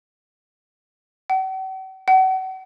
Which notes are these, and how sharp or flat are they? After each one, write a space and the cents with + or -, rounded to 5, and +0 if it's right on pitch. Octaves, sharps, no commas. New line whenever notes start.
F#5 +45
F#5 +35